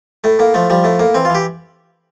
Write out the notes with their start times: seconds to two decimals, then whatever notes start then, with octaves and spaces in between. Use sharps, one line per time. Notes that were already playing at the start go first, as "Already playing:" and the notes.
0.24 A2 A3
0.39 A2 A#3
0.54 F3 A3
0.70 F3 G3
0.84 A2 A3
0.99 A2 A#3
1.14 E3 C4
1.25 F4
1.30 E3 G4